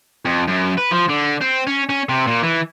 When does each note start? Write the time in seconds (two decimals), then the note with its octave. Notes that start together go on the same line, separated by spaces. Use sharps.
0.25 F2
0.47 F#2
0.77 B4
0.91 F3
1.09 D3
1.41 C4
1.67 C#4
1.89 C#4
2.09 C3
2.27 A#2
2.43 E3